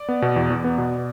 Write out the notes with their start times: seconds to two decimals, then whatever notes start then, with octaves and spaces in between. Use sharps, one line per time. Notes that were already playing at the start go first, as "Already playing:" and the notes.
Already playing: D5
0.09 B3
0.22 B2
0.36 E2
0.50 E2
0.64 B3
0.78 B2